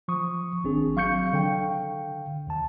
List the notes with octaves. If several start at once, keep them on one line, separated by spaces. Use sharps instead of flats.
F3 C#6 D#6
G#1 C4 D4 G#4
F#3 F5 C#6 G6 C#7
D3 F5 G5
D#2 D3 A5